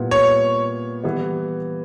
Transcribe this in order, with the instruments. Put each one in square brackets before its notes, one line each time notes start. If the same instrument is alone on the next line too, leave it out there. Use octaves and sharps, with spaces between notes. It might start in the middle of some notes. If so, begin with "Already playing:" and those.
Already playing: [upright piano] A#2 G3 B3 E4
[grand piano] C#5
[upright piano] E3 G3 B3